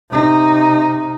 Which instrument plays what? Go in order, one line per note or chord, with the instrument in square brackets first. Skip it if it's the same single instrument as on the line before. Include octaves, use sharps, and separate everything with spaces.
[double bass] C3 D#4